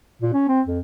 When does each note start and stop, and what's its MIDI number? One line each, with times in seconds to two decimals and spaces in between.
0.22 0.33 46
0.34 0.45 61
0.48 0.61 60
0.67 0.80 41